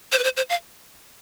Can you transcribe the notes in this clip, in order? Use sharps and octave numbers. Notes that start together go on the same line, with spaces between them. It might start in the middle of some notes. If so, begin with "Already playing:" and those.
C5
B4
C5
C5
F5